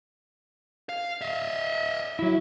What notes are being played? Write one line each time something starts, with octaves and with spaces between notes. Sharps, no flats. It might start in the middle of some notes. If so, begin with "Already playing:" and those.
F5
D#5 E5
F#3 E4